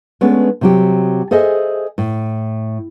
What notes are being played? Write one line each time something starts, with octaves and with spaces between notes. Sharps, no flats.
G#3 A3 B3 C#4 D4
C3 F#3 G4
G#4 A4 C5 D#5 E5 G#5
A2